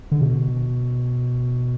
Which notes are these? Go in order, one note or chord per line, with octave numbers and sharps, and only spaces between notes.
D3
B2